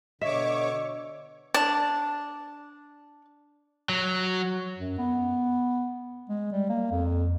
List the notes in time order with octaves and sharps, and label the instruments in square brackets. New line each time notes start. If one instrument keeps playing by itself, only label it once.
[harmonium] B2 D3 [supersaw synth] C#5 C#6 D6 [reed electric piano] D#5 E6 [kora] E5
[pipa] D4 [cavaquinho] A5
[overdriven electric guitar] F#3
[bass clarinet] F#2
B3
G#3
G3
A#3
F2